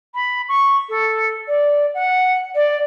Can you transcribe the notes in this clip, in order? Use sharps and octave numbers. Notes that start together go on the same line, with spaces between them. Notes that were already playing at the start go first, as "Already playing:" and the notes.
B5
C#6
A4
D5
F#5
D5